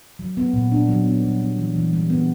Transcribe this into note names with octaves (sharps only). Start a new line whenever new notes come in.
F#3
B3
A#2
D4
F#3
B3
G3
B3
E3
E3
G3
B3